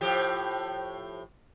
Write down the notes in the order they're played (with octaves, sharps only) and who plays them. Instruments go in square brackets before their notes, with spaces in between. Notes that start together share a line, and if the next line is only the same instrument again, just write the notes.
[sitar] A2 F3 G4